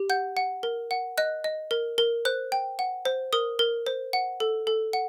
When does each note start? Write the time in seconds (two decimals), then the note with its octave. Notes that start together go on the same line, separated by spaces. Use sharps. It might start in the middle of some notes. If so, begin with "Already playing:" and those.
Already playing: G4
0.10 F#5 G6
0.37 F#5
0.63 A#4
0.91 F#5
1.18 D#5 F#6
1.44 D#5
1.71 A#4
1.98 A#4
2.25 C5 F#6
2.52 G5
2.79 F#5
3.05 C5
3.33 A#4 D#6
3.59 A#4
3.87 C5
4.13 F#5
4.40 A4
4.67 A4
4.93 F#5